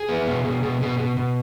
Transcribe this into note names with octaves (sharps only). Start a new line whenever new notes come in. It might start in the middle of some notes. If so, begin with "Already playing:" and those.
Already playing: G#4
B3
B2
B2
B2
B2
B2
B2